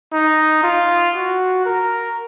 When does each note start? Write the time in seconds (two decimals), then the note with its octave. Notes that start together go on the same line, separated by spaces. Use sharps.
0.13 D#4
0.64 F4
1.15 F#4
1.66 A#4